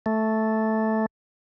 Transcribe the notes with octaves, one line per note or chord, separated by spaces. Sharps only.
A3